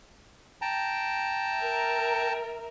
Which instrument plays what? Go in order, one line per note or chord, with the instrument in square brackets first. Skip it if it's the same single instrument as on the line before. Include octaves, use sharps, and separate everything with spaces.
[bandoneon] G5 A5 A#5
[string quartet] A#4 E5